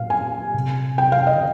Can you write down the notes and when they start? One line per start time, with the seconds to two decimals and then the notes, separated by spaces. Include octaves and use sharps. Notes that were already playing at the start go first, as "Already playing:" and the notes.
Already playing: A#2 F5
0.10 G#5
0.55 C3
0.98 G5
1.12 F5
1.27 D#5
1.34 D3